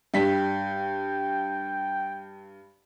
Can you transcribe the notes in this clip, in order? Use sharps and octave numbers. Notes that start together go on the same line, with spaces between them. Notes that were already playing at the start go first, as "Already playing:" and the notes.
G2 G5 B6